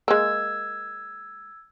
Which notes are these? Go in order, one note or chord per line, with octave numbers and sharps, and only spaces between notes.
G#3 A#3 E6 G#6